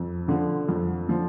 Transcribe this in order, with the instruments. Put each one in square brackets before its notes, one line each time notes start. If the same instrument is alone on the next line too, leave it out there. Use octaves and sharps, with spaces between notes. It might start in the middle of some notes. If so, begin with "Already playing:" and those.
Already playing: [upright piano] F2
D3 F3
F2
D3 F3